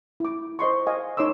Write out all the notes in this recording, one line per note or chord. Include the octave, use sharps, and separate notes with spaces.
E4 D6
C5 D#5 C6 C#6
D#5 F5 G#5
D#4 C#5 C6 D6 E6